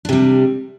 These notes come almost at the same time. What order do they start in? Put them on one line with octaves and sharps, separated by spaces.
D4 C3 G3